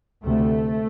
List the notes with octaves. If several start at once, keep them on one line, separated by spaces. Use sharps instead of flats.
D2 C3 A3